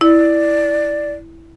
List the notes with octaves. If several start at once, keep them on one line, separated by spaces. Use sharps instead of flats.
E4 D5